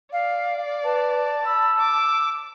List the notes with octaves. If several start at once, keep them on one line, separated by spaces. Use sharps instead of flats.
D5 F5
B4 A5
B5 E6
D6